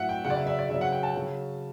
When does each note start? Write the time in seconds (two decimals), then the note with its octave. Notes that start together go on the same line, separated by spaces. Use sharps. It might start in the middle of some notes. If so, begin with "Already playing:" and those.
Already playing: A2 F#3 E5 F#5
0.09 G5
0.24 C#3 F#3 F#5
0.30 D5
0.36 E5
0.47 E5
0.59 D5
0.69 C#3 E5
0.74 F#3
0.81 F#5
0.92 G5
1.03 A5
1.15 C#3 F#3